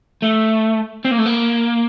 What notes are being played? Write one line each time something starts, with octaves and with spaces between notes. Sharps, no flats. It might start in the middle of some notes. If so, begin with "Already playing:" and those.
A3
C4
A#3
A3
A#3